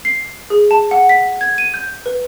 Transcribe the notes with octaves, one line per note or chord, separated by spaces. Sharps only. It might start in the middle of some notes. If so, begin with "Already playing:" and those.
C7
G#4
A5
F#5
B6
G#6
D#7
G6
B4